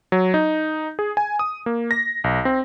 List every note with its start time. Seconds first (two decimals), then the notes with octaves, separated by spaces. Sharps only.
0.12 F#3
0.34 D#4
0.99 G#4
1.17 G#5
1.39 D#6
1.66 A#3
1.91 A#6
2.24 B1
2.45 C4